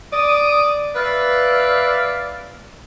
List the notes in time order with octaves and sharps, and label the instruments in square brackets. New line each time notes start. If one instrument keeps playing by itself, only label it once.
[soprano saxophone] D5 [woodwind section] D#6
[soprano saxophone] B4 [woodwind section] D5 E5 F5